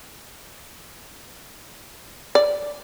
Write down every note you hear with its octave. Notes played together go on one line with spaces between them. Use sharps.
D5